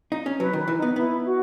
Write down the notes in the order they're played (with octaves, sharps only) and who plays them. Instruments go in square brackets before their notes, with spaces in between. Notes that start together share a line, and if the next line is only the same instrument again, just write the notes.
[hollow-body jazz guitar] D#4
C#4
[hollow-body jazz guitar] F#3 [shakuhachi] B4
[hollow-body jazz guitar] D#3
[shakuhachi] B4
[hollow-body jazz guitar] E3
[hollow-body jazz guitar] B3 [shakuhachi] D#4
[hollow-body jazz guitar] B3 [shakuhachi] E4
[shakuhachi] F#4